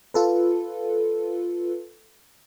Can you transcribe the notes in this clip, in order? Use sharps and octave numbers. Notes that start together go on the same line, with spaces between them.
F4 A4 B4